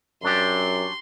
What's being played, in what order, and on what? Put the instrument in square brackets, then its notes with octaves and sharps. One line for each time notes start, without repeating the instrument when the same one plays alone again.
[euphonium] F#2 [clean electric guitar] F#3 D4 G4 [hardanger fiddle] C6